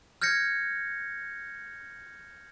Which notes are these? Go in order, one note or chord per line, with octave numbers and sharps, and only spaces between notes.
F6 G6 G#6 A#6 C#7